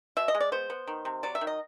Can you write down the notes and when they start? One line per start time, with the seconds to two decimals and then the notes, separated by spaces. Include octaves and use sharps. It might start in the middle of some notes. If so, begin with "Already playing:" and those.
0.17 B2 E5
0.28 D#5
0.35 G#3
0.40 D5
0.52 B3 C5
0.70 B3
0.87 D#3
1.05 C3
1.23 F#3 D5
1.35 E5
1.41 D#3
1.47 D#5